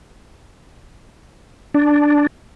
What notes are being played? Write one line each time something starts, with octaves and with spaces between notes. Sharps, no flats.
D4